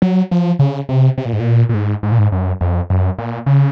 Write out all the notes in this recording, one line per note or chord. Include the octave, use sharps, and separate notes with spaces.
F#3
F3
C#3
C3
C3
A#2
G#2
A#2
A#2
G#2
G#2
A#2
G#2
F#2
F2
F#2
A#2
C#3